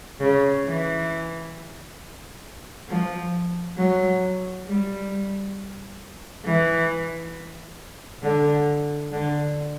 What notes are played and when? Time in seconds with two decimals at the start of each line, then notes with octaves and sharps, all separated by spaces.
0.20 C#3
0.65 E3
2.89 F3
3.77 F#3
4.66 G3
6.45 E3
8.23 D3
9.12 D3